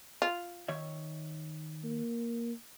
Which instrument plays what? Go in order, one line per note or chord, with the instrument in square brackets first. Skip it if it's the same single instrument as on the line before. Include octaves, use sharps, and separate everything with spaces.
[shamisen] F4
[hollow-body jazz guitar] D#3 C#5 E5
[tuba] A#3